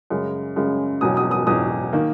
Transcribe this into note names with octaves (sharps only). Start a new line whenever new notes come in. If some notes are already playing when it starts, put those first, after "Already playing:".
F#2 C#3 G#3
F#2 C#3 G#3
E1 E2 B2 F#3 D#6
D#6
D#6
E1 E2 B2 F#3 D#6
D#3 A#3